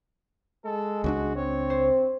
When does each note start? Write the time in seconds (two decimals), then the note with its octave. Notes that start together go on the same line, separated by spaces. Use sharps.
0.65 G#3 A4
1.04 C#2 A3 D4 F#4
1.36 C4 C#5
1.70 C5